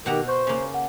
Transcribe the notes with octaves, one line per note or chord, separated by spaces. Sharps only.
B2 D#3 G4 F#5 A#5
C5 C#6 G6
C#3 A#3
F#5